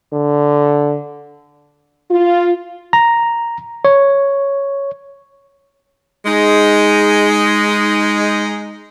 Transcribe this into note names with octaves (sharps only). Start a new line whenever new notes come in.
D3
F4
A#5
C#5
G#3 D#4